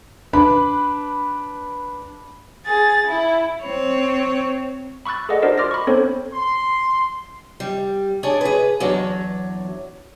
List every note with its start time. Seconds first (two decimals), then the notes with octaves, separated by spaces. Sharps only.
0.33 D4 B4 B5
2.65 G#4 A6
3.06 E4
3.62 C4 C#5
5.06 B5 C#6 E6 F#6 A6
5.29 G#4 A4 D5 D#5 F#5
5.42 D4 F#4 A#4 C5 D5 D#5
5.58 C6 D6 F6 A6 A#6
5.71 B5 C#6
5.87 B3 C4 D4 A4 C5 C#5
6.33 C6
7.60 G3
8.23 D4 G#4 C#5 D5
8.41 G#4 B4
8.80 E2 F#3 D4 C#5